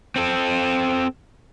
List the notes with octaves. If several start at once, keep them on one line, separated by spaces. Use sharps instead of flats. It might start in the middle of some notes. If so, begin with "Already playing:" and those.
C4 A4